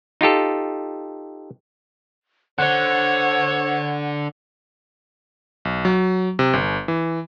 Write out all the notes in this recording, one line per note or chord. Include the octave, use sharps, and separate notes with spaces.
D#4 F4 G4 A4
D3 C5 C#5 F#5
B1
F#3
C3
G1
E3